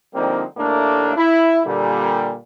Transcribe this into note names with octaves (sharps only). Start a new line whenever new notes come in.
D3 F3 G3 A#3 C4 D#4
D#2 A2 A3 A#3 D4
E4
A#2 D3 G3